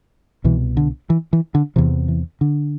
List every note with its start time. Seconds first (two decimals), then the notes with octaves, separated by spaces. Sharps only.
0.44 C2 B2 E3
0.77 D3
1.10 E3
1.33 E3
1.55 D3
1.76 E2 C3 E3
2.08 E3
2.41 D3